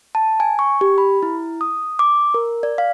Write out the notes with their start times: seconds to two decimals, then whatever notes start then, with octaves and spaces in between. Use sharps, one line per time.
0.15 A5
0.40 G#5
0.59 C#6
0.81 G4
0.98 B5
1.23 E4
1.61 D#6
1.99 D6
2.34 A#4
2.63 D5
2.78 F5